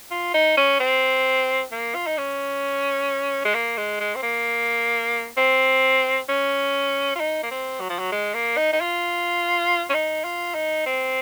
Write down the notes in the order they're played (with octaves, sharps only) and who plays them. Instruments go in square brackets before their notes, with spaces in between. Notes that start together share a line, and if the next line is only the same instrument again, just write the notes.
[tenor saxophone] F4
D#4
C#4
C4
A#3
F4
D#4
C#4
G#3
A#3
G#3
G#3
C4
A#3
C4
C#4
F4
D#4
A#3
C4
F#3
F3
F#3
G#3
A#3
D#4
D#4
F4
C#4
D#4
F4
D#4
C4